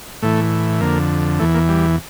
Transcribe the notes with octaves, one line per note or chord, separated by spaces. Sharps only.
A2 E3 A3
F2 D3 A#3
E2 E3 A3
A#3
G3